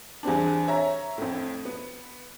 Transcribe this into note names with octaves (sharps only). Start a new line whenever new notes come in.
E2 G3 C4 D4
C#5 E5 A#5
F2 A2
B3